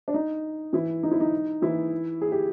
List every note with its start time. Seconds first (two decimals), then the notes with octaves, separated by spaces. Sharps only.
0.08 D4
0.14 D#4
0.73 E3 E4
1.03 D#4
1.11 E4
1.20 D#4
1.62 E3 E4
2.21 G#4
2.32 G4